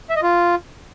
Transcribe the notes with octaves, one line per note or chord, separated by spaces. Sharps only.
E5
D#5
F4